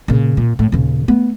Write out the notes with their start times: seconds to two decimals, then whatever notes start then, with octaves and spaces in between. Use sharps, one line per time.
0.08 A#2 C#3
0.37 A#2
0.59 A2
0.72 D#1 C#3
1.08 A3 B3